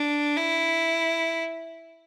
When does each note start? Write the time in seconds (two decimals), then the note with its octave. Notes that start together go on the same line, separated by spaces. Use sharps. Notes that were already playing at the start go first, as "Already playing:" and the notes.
Already playing: D4
0.36 E4